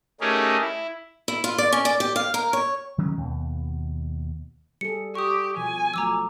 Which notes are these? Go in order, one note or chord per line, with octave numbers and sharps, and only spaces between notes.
A3 C#4 D#4 G4 G#4 A#4
E4
E4
F4
D5
C#4
D5
G4
F5
A#4
C#5
D#3 F#3 G#3 C#4
D#2 B2
G3 G#4 A4 C#7
G4 C#6 D#6
B2 F3 G#5
F3 F#3 A3 A#5 D6 E6